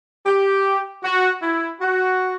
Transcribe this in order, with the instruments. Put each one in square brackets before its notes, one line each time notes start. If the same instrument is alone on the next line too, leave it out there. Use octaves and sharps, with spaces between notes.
[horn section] G4
F#4
E4
F#4